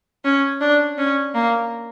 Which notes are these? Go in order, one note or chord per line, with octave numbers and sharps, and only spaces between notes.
C#4
D4
C#4
A#3